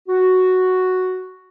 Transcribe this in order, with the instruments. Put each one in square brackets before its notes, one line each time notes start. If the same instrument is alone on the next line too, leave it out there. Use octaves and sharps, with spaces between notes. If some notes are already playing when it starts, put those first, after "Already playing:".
[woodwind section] F#4